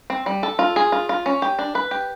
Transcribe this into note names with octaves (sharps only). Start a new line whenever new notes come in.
C4
G3
A4
F4
G#4
F4
F4
C#4
G4
D4
B4
G4